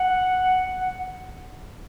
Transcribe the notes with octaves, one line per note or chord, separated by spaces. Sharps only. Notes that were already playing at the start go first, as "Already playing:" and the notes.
Already playing: F#5